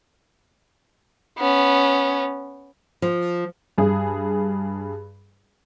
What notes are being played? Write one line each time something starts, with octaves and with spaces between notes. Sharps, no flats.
B3 C#4
F3
G2 G#4